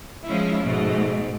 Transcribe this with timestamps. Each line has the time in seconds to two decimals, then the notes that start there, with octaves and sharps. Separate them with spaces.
0.26 F3 G#3 C#4 E4
0.61 G#2 B2 A3